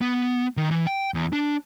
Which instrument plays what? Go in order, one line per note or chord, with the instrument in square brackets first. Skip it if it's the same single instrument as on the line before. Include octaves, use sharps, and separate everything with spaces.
[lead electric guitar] B3
D#3
E3
G5
E2
D4